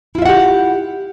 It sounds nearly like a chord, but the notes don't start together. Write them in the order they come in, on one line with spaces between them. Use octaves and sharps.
E4 F4 E5 F#5 G4